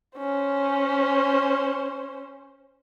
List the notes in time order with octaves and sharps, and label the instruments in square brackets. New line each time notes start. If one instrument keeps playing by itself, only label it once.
[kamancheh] C#4 C5